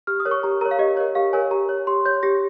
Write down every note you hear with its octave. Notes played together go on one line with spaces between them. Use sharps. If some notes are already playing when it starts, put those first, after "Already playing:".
G4 F6
D#6
A#4 C#5
C#6
G4 A#5
A#4 C#5 A#5
F5
G4 D#5
A#4 C#5
G4 F5
A#4 C#5 G#5
G4 A#5
C#5
G4 C6
C#5 G6
G4 A#6